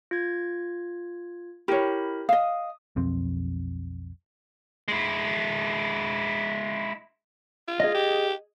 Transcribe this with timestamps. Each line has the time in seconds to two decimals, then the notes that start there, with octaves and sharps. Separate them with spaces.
0.11 F4 G#6
1.68 E4 G4 A#4 C#5 B5
2.29 D#5 F5 D#6
2.96 B1 F2 C4
4.88 G#3 E4
7.68 F4
7.80 G#4 D#5
7.95 G4